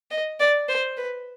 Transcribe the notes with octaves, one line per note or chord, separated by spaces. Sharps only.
D#5
D5
C5
B4